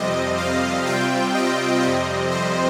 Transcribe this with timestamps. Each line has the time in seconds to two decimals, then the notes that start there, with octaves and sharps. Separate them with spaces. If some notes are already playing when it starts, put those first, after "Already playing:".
Already playing: F2 C3 G3 C4 D#5
0.38 F5
0.86 C3 G3 C4 F4 G5
1.35 D#5
1.83 F2 C3 G3 C4 D#5
2.31 C5